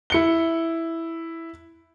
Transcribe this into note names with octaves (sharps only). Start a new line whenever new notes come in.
E4 C#7 G7